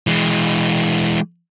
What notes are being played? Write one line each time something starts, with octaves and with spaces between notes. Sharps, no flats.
E3 G#3